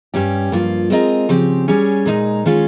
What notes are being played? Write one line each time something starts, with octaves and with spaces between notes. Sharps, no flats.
G2 G3 C#4 G4
G2 F3 A#3 F4
G#3 C4 F4 A#4 D#5
C#3 F3 C4 G4
G3 C#4 G#4 C#5
A#2 G#3 D#4 A#4
D#3 G#3 C#4 F4